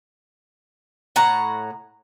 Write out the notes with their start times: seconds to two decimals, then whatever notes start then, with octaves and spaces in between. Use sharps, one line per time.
1.16 A2 F#5 A#5